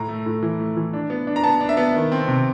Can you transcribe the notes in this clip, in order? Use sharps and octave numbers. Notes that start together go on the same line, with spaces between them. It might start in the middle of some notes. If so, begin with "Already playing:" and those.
Already playing: A2 A#5
A3
A2
E3
A3
E3
D4
B3
D4
A#5
B3 A5
D4
E5
B3
D#3
C4
C3